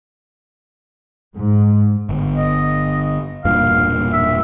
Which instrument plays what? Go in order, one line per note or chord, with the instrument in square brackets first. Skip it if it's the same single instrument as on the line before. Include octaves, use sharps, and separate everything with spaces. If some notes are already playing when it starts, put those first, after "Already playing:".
[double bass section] G#2
[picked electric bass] G1
[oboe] D#5
[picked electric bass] E1 G2 A#2 [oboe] F5
[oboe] E5